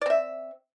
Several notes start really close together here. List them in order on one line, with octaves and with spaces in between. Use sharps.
D5 C4 E5